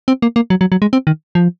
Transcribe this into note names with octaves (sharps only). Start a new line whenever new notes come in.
C4
A#3
A#3
F#3
F#3
F#3
G#3
C4
D#3
F3